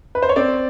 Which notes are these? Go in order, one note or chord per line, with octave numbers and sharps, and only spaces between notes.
B4
C5
C#5
C4 D5